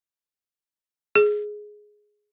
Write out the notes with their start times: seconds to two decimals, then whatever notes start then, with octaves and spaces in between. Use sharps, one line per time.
1.16 G#4